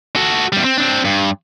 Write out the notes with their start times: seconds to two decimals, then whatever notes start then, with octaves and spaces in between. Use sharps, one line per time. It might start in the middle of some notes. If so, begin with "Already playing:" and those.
0.16 F#4 A4
0.53 E2 G3
0.65 C4
0.78 C4 D4
1.05 G2